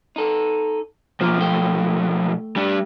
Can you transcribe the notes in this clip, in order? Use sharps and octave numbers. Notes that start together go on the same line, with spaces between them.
D#4 A4
B1 F3 A#3 F4 C5
A3 G5
G3 D4